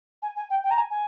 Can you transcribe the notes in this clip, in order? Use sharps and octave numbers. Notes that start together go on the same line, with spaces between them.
G#5
G#5
G5
G5
A#5
G#5
G#5